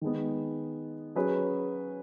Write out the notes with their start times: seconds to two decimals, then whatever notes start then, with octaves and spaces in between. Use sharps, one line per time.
0.01 D#3 G#3 B3
1.16 F#3 C#4 G#4 B4